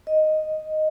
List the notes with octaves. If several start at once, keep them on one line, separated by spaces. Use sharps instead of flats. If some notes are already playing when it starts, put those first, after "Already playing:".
D#5